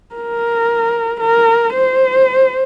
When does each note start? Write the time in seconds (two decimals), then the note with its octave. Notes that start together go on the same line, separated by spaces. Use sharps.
0.15 A#4
1.20 A#4
1.73 C5